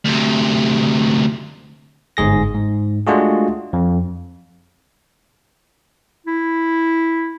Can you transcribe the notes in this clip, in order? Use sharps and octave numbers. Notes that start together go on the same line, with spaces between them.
D2 C3
G1 G#2 G#4 A#6
G#2
G#3 A3 D4 F4 F#4 G#4
F2
E4